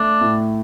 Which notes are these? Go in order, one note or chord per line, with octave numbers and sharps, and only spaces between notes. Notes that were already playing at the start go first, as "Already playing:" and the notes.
Already playing: A3 D4
A2